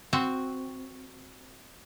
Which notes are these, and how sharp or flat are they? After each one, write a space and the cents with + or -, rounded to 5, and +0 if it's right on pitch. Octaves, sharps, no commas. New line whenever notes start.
C4 +0 F#4 +0